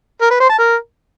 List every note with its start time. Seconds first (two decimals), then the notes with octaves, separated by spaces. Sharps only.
0.21 A#4
0.31 B4
0.40 C5
0.49 A5
0.59 A#4